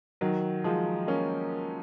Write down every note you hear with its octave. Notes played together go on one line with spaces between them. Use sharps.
D#3 F#3
F3 G#3
A#3 C#4